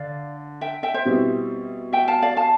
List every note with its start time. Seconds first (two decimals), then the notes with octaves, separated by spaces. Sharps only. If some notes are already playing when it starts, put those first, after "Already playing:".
Already playing: D3 D5 F5
0.61 E5 G5
0.83 E5 G5
0.94 C5 E5
1.05 B2 G3 C4 E4
1.93 E5 G5
2.08 F5 A5
2.22 D5 F5
2.37 F5 A5